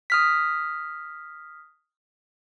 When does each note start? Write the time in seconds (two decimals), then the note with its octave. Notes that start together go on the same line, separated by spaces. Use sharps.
0.10 D#6 F6 B6